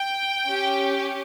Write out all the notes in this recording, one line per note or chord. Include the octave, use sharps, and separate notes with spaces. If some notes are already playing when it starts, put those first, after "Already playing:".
Already playing: G5
C#4 G4